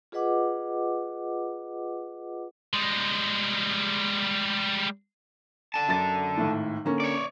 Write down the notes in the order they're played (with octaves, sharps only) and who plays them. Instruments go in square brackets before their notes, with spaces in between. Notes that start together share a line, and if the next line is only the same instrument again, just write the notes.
[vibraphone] F4 G#4 B4 D#5 F#5 D6
[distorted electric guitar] G3 G#3
[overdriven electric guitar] D3 A5
[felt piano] F#2 A6
G#1 A2
D3 A#3 C#4
[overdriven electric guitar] C#5 D5